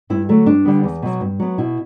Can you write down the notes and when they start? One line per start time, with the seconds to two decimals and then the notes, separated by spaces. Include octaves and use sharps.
0.10 G2 E4
0.29 D3 F#3 A3
0.46 G2 D4
0.65 D3 G3 B3
0.83 E2
1.02 B2 F#3
1.20 G2
1.40 F#3 B3
1.58 B2 E4